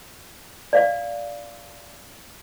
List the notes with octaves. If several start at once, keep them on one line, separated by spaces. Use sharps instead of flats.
D5 F5